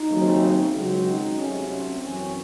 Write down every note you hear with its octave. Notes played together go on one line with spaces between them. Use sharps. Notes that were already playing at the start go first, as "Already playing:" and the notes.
Already playing: D#4
D#2 C#3 F#3 A3 C4
C#2 C#3 F#3 G#3 C4 F#4
D#3 D#4
C2 C3 F#3 A3 C#4
C4
F#2 E3 C4 C#4